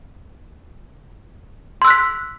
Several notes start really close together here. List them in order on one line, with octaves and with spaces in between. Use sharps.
C6 E6 F#6 B6